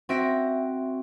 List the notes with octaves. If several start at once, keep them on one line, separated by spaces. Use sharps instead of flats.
C4 F#4 E5 A#6 D7